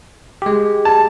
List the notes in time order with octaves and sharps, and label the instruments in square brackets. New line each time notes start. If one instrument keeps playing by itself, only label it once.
[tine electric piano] G#3 G4
[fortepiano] A5